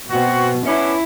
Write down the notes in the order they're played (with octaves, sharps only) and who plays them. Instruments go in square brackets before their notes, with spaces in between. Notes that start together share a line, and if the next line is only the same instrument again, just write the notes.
[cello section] B2 [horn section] C4 F#4
[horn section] B3 C#4 D4 [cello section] E4